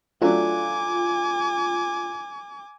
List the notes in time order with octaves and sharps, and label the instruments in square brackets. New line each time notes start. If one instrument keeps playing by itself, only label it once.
[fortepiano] F#3 A3 D4 [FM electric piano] F4 [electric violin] G#5 D6